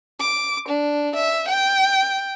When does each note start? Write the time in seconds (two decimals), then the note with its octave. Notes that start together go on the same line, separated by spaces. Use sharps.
0.20 D6
0.69 D4
1.16 E5
1.49 G5